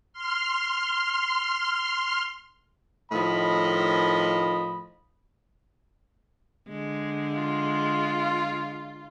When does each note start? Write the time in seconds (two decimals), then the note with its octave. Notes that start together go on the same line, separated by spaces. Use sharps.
0.13 C6 F6
3.12 A2 D#3 F3 D#5 B5
6.69 D3 G#3
7.34 F4